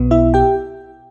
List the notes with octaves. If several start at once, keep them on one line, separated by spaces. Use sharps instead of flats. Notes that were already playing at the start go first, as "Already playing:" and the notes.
Already playing: B1 B2 B3
E4 E5
G4 G5